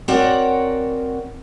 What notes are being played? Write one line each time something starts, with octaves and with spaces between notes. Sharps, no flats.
C4 F#4 A#4 C#5 D5 F#5